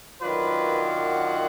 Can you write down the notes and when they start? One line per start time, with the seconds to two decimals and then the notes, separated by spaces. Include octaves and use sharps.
0.20 F#2 D#3 F#3 D4 F4 B4
0.86 F#5